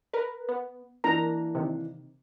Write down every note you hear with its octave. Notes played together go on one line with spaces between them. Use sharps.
A#4 B4
B3
E3 A#3 D4 A#4 A#5
C3 D#3